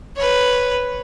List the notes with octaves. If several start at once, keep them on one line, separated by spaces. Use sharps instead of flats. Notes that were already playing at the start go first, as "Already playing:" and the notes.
B4 C#5